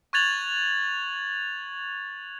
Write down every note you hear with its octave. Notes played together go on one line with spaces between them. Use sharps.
C#6 F#6 G#6 A6 F7 F#7